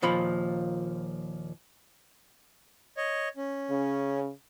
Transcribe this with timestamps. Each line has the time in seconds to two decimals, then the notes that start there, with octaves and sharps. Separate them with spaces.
0.02 D#2 A#2 F3 B5
2.97 C#5 D#5
3.37 C#4
3.70 C#3